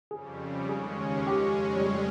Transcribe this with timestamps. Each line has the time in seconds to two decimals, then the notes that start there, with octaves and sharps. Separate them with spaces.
0.11 F2 C#3 G3 G#4
0.69 D#2 C#3 G#3 C#4 G#4
1.27 F2 C#3 G#3 C#4 G4
1.77 G3
1.84 G#3
1.95 G3